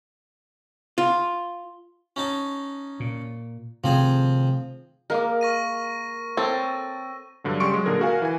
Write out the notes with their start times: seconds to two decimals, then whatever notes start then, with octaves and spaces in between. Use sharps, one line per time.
0.98 F4
2.16 C#4 D#4 A5
3.00 A#2
3.84 C3 D#3 F3 A3 C4 G#4
5.10 G#3 A#3 A#4 D6
5.41 C#6 A#6 D#7
6.37 C4 A4 C#5
7.44 G2 D3 F#3
7.60 C#3 G3 C6 C#6 D7
7.74 F#3 G#3
7.86 A#2 D3 G#4 A#4
8.01 F#4 A#4 F5 G#5
8.22 E3 G#5